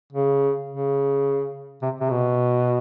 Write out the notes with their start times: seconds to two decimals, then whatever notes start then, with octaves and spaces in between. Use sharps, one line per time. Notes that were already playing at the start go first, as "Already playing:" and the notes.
0.12 C#3
0.69 C#3
1.82 C3
2.01 C3
2.10 B2